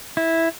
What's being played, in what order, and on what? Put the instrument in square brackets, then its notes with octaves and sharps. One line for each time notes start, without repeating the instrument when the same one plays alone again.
[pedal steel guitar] E4